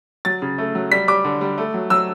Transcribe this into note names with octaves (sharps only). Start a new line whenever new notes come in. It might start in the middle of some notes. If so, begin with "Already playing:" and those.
F#3 A6
C#3
A3
F#3
G3 B6
G3 D6
D3
G3
A3
F#3
F#3 E6